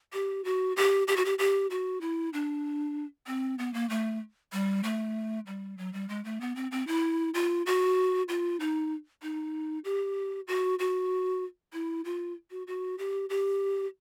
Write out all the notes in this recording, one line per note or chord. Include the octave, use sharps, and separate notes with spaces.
G4
F#4
G4
G4
F#4
G4
G4
F#4
E4
D4
C4
B3
A#3
A3
G3
A3
G3
F#3
G3
G#3
A3
B3
C4
C4
E4
F4
F#4
F4
D#4
D#4
G4
F#4
F#4
E4
F4
F#4
F#4
G4
G4